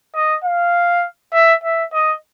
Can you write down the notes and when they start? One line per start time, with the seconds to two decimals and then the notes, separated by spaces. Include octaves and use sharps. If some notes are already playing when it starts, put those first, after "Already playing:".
0.15 D#5
0.44 F5
1.33 E5
1.63 E5
1.93 D#5